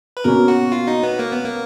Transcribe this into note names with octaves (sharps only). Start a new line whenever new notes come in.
B4
B2 A#3 C#4 A#4
F#4
F4
D#4
B3
A#3
B3
A#3